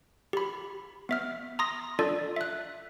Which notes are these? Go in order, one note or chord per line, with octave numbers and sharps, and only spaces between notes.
G4 B5
B3 E5 F6
A#5 C6 D#6 A#6
D4 F4 A4 D5
E5 F#6